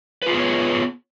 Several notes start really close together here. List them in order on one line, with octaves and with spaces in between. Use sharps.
B4 F4 G#4 B3 C#5